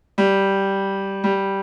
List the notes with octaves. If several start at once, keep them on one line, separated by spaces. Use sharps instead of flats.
G3
G3